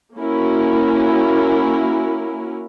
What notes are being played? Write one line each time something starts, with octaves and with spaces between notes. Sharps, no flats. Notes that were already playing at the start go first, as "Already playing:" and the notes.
A#3 C#4 E4 F#4 A#4